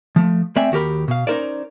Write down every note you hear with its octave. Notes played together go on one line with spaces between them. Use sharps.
F3 A3
A3 C4 D5 E5 G5 G#5
D#2 F#4 G4 A#4 B5
B2 F5
C#4 D#4 E4 A#4 C5 D5